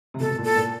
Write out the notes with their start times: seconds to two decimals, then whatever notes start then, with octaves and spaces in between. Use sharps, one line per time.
0.14 C3
0.20 B2 A4
0.31 B2
0.38 A#2
0.44 A4
0.55 A#2